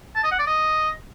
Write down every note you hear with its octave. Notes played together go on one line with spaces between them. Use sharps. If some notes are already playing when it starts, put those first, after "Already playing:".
A5
D#5
F#5
D5
D#5